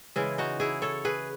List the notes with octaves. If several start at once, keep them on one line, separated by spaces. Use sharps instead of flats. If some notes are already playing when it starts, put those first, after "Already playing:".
C#3 E3 G#3 E4 G#4
D#4 F#4
E4 G#4
A4 C#5
G#4 B4